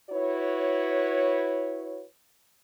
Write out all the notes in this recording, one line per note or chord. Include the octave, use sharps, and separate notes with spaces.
E4 F#4 B4 C#5